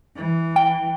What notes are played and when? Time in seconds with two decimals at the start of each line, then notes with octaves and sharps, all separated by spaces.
0.15 E3
0.56 G5